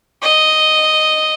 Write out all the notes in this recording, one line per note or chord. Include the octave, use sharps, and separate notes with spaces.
D#5